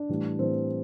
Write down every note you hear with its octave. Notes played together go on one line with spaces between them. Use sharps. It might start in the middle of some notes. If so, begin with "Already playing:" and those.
Already playing: D4
A2 E3 G3
A2 E3 G3 C4